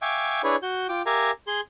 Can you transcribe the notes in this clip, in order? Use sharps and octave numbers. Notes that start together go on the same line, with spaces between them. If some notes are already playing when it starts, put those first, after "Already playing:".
E5 F5 G5 G#5 C#6 D6
D4 E4 G#4 B4 C#5
F#4 G6
F4 G5 D6
G4 A#4 E5 F5 G#5 A#5
G#4 C6